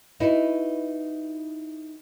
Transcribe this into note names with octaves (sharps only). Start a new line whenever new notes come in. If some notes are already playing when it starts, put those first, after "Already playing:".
D#4 E4 F#4 B4